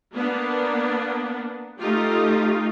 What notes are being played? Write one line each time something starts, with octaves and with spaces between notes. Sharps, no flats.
A#3 B3 D4
A3 D#4 F4 G4